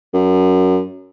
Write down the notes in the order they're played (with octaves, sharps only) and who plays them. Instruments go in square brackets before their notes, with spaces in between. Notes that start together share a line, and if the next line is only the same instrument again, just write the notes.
[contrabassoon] F#2